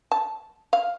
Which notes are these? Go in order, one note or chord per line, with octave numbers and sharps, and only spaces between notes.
A5
F5